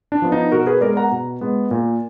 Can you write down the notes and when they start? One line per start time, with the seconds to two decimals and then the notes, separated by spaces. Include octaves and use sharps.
0.12 D4
0.22 F3 B3
0.32 D#4
0.52 B2 F#4 A#4
0.67 G#4 B4
0.81 G#3 B3 A#4 D5
0.97 F#5 A#5
1.11 B2
1.41 G#3 B3
1.71 A#2